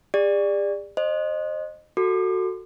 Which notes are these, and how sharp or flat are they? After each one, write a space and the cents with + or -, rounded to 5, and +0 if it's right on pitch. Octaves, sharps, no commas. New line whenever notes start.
G#4 -45 D5 +5
C5 +20 D#5 -20
F#4 +0 A4 +15 D6 +40